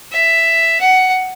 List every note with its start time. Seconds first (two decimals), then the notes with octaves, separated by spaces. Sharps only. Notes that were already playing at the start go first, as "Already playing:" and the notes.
0.12 E5
0.81 F#5